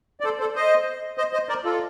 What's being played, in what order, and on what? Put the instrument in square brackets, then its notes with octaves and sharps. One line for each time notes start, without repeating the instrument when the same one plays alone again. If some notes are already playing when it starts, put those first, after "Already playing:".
[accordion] D5
A4 C5
A4 C5
C5 D#5
C5 D#5
C5 D#5
A#4 D5
F4 A4